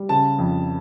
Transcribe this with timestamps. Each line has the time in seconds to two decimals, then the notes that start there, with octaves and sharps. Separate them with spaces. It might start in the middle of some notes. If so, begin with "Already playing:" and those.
Already playing: G3
0.09 C#3 A5
0.38 F2